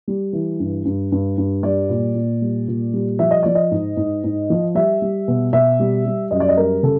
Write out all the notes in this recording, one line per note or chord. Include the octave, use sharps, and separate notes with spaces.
G3
E3
G2
G2
G2
G2
G3 D5
A#2
A#2
G3
A#2
G3
F3 E5
D#5
F3 D5
D#5
G#2
G#2
G#2
F3
G3 E5
G3
B2
B2 E5
G3
G3
F#2 D#5
D5
D#5
G3 A#4
C#3 A4